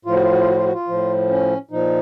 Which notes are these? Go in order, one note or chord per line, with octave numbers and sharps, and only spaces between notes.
A2 F3 F4
F#4
F4
F#4
F4
F#4
F4
F#4
F4
A2 F3
C#4
A#2 F3 D#4